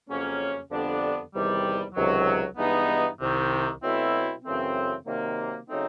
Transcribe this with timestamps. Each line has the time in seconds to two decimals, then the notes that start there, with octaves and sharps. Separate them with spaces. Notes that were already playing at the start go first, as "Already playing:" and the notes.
0.08 F2 C#3 F#3 A#3 C#4
0.70 F2 D3 G3 B3 D4
1.33 E2 C3 D#3 G3
1.95 C#2 C3 D#3 F#3
2.57 G2 E3 G#3 B3 D#4
3.19 C2 C3 D#3
3.82 B2 F#3 A3 C4 E4
4.44 F#2 C#3 E3 A3 C4
5.06 C3 D#3 F#3 A#3
5.69 C#3 F#3 A3 C4 D#4